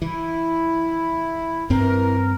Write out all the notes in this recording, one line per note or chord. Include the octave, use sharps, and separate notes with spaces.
E3 E4
G2 E3 C4 A#4